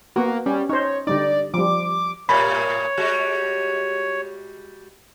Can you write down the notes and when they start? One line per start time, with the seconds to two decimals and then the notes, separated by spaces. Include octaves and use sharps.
0.16 A#3 B3 F#4
0.46 G3 C#4
0.69 D#4 C5 C#5
1.07 D3 G3 D#4 D5
1.54 F3 G3 D6
2.29 A2 G3 A#3 C#5 B5
2.97 G3 G#3 F#4